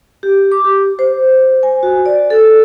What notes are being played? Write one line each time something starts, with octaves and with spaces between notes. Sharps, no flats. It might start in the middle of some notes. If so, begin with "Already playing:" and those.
G4
D6
G4
C5
G#5
F#4
D5
A4